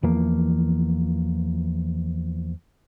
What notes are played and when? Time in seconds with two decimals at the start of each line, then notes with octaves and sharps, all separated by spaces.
0.03 E2 E3 F3 A#3